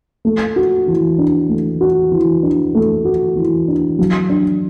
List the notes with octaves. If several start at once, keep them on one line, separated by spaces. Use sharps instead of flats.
A3
F#4
E3
D4
A3
F#4
E3
D4
A3
F#4
E3
D4
F#3
D4